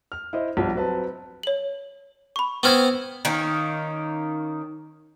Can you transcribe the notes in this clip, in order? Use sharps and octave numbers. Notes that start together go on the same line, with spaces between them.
F6
E4 C5 D#5
B1 G2 F3
F#3 C4 B4 A5
C#5 F#7
B5 C#6
B3 C4 C5 C#6 F6 G#6
D#3 A#3 C#4 D#4